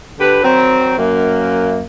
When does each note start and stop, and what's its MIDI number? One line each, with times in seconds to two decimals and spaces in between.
0.20 0.39 50
0.20 0.39 67
0.20 0.39 71
0.43 0.94 51
0.43 0.94 54
0.43 0.94 60
0.97 1.82 42
0.97 1.82 58